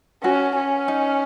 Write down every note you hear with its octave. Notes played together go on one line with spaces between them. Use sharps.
C#4 F#4
C#4
D#4